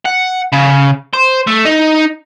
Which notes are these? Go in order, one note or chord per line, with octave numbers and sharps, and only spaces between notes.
F#5
C#3
C5
A3
D#4